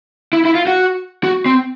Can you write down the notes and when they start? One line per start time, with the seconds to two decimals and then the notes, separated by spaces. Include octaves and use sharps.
0.33 E4
0.45 E4
0.55 F4
0.67 F#4
1.23 F#4
1.46 C4